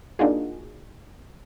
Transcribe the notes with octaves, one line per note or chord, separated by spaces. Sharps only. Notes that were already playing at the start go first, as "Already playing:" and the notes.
A#3 D4 D#4 F4 F#4 G#4